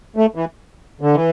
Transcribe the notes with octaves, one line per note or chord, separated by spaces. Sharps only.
A3
E3
D3
E3